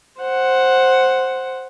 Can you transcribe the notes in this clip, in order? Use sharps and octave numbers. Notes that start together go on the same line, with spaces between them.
C5 F#5